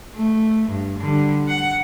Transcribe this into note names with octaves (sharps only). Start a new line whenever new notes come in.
A3
G2
D3 G3
F#5